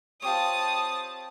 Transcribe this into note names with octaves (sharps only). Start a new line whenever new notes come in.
C4 F4 G4 C#5 A5 D#6